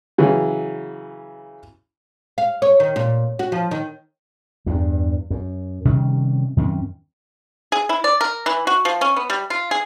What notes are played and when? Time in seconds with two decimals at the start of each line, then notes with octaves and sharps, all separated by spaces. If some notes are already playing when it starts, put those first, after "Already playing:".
0.18 C#3 E3 F#3
2.38 F5
2.62 C#5
2.80 D#3
2.96 A#2
3.39 F#4
3.52 F3
3.71 D#3
4.66 E2 G2
5.30 F#2
5.85 C3 D#3 G3 C#4
6.57 F#2 D#3 C4 C#4
7.72 G#4
7.89 E4
8.04 D5
8.21 A#4
8.46 E3
8.67 F#4
8.85 F3
9.01 C#4
9.16 B3
9.30 G3
9.50 F4
9.71 G#4